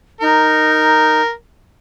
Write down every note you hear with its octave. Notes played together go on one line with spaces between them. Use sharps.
D#4 A#4